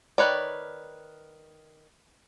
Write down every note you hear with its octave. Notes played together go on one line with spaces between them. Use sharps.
D#3 A3 B4 C#5 D5